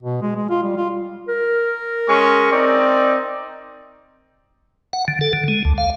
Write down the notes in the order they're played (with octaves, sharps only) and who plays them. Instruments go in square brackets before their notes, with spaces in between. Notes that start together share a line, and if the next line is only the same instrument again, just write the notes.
[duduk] B2
G#3
G#3
F4
G3
F4
[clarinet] A#4
[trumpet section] G#3 C#4 C#6
C4 D#4 D5
[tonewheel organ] F#5
D3
A4
D3
G#3
D2
F5